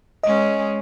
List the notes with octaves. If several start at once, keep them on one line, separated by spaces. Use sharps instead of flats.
G#3 C#4 D#5